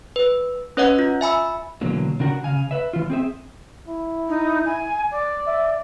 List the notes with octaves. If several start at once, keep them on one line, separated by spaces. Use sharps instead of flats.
B4
C#4 B4 C#5 D#5 F#5
F4
E5 G#5 B5 E6
B2 D3 E3 F#3 A#3
C#3 D4 F#4 A#4 F#5
C#3 F5 G#5
B4 E5
E3 F4
C4 G#4 E5
E4
D#4
G#5
D5
E5